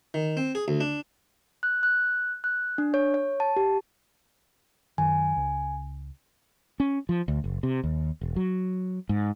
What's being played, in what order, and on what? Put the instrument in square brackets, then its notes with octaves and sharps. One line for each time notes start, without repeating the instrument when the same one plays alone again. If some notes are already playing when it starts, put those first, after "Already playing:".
[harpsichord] D#3
C4
G#4
D2
D4
[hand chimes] F#6
F#6
F#6
D4
C#5
C#5
A5
G4
[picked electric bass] F#2 D#3 [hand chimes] G#5
[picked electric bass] C#2
[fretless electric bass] C#4
F3
D2
F#1
C3
D#2
E1
F#3
G#2